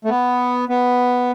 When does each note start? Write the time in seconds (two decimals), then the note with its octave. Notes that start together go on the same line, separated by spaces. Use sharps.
0.05 A3
0.09 B3
0.69 B3